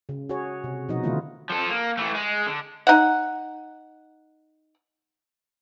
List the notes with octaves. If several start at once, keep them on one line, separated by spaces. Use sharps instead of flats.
C#3
F#4 G#4 C#5
C3
B2 F3 D#4 F#4 D#5
D3 D#3 A3 E4 F4
F3 A4
A#3
E3 A3
G#3
D3
D#4 F#5